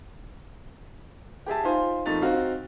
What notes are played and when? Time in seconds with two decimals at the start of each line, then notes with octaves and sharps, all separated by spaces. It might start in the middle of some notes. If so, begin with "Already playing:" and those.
1.46 G4 G#4 E5 A5
1.64 D#4 F4 C5 G#5
2.06 F2 A#2 A3 D#4 A6 F7
2.22 C4 D#4 F#4 F5